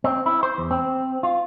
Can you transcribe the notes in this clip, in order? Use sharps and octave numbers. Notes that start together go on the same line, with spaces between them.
C4
E4
C5
E2
C4
F4